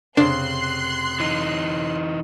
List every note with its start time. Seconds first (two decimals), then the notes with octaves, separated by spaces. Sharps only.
0.17 F1 C#3 D4 C5 C6 F#6 C7
1.20 E3 D#4